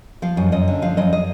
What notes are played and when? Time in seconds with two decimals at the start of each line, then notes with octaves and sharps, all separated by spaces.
0.22 F3 F5
0.37 F#2 D#5
0.52 F#2 D#5
0.68 D3
0.82 F3 F5
0.97 F#2 D#5
1.13 D#5